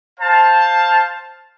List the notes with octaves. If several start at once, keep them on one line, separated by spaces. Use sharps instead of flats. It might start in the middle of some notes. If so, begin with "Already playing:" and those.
C5 F5 A5